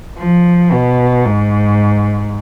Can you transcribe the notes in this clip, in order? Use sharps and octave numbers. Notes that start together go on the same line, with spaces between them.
F3
B2
G#2